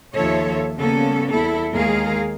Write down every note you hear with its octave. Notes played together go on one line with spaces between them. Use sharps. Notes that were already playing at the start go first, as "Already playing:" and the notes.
D#2 F3 A4 C#5 E5
C#3 G3 A#3 B3 C#4 A4
E2 E4 A4
D#2 D#3 G#3 G#4 A#4 F5